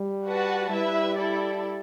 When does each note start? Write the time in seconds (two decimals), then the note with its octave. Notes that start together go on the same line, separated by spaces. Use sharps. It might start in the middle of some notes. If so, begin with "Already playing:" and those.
Already playing: G3
0.24 F#4 B4 F#5 A5
0.70 G3 E4 B4 E5
1.16 E4 A4 D5